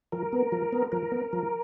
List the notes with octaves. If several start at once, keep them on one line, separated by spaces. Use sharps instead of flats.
F3 A#4
B3
F3
B3
F3 A#4
B3
F3